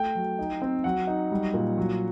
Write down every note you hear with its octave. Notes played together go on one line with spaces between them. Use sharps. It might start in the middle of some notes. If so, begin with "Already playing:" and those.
Already playing: A3 G5
F#3
D#4
C4
F#3 F#5
D#4
G3
A#2
F#3